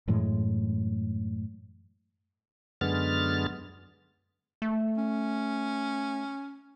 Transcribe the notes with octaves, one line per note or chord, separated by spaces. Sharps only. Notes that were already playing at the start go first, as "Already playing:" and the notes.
F#2 A2 E3 G#3
F#2 D3 G#3 B3 F6 A6
A3
C#4